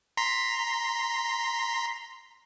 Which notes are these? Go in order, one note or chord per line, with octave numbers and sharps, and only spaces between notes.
A#5 C6 B6